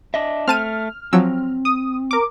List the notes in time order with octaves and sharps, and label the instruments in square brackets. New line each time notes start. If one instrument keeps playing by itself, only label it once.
[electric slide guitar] D4 D#5 E5
[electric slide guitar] A3 [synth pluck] C4 A5 D#7 [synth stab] F6
[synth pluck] F3 F#3 E6 [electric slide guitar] C4
[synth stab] D#6
A#4 D6